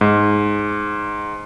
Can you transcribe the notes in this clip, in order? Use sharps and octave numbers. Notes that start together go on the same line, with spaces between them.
G#2